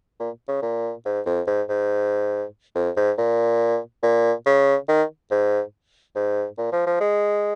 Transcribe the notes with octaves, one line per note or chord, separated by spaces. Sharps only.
A#2
C#3
A#2
G#2
F2
G#2
G#2
F2
G#2
A#2
A#2
C#3
D#3
G#2
G#2
A#2
F3
F3
G#3